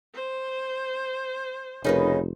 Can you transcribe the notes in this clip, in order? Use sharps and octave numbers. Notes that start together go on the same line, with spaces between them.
C5
F1 C#3 D#4 A#4 B4